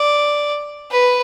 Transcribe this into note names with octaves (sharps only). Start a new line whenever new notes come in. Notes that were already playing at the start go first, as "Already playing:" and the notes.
Already playing: D5
B4